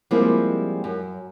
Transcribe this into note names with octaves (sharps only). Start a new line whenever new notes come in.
F3 G3 G#3 A#3 C4 E4
F#2